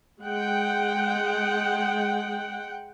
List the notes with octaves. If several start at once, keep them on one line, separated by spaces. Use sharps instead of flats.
G#3 F#5 G5